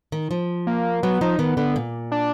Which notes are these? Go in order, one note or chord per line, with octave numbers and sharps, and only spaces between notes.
D#3
F3
A#3
F#3 B3
F3 D#4
D#3 B3
D3 B3
A#2
D4